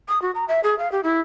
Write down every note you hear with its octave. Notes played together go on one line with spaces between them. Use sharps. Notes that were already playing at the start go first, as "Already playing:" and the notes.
D#6
F#4
A#5
E5
G#4
F5
G4
E4